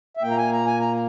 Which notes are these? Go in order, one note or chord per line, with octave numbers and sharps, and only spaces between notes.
E5
A#2 A#3 G5
A#5
G#5
A#5
G#5
A#5